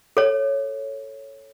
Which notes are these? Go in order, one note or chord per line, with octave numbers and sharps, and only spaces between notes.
A4 C#5